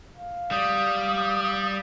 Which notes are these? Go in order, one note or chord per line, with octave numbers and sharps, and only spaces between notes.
F5
G3 D#6